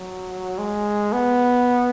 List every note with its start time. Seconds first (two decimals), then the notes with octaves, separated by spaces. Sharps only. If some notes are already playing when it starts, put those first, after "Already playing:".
Already playing: F#3
0.58 G#3
1.13 B3